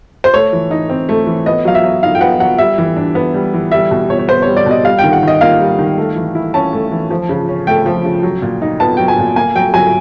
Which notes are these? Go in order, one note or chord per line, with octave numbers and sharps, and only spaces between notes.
C5
A3 C#5
E3
D#4
C4
A3
E3
B3 D#5
F#3 F5
E5
F#3
D#4 F5
G5
B3 F#5
F#3 F#5
G3 E5
E3
D4
B3
G3
E3
G3 E5
B2
B2 C#5
C#5
B3 C5
G3 C#5
D5
B2 D#5
G3 F5
D#3 G5
F#5
D#3 D#5
A#3 F5
G3
D#3
A3
E3
E4
C#4 A5
A3
E3
F3
C#3
C#4
A3 G5
F3
C#3
F#3
A#2
D#4
B3 A5
F#3 G5
G#5
A#2
A#3 G#5
F#3 G5
F#3 G#5